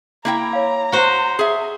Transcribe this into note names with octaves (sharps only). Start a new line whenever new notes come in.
A#3 E4 G5 A#5
C#5 F5
F#4 C5
G#4 E5